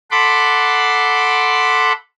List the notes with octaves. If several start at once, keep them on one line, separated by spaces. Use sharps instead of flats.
A4 F#5 B5 C6 D6